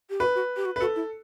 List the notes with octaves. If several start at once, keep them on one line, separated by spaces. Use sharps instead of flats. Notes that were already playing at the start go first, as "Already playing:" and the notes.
G4
F#4 B4
F#4
G4
F#4
B4
F#4 A4
E4